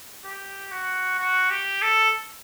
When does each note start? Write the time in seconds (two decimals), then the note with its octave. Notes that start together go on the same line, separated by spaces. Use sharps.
0.25 G4
0.72 F#4
1.19 F#4
1.51 G4
1.82 A4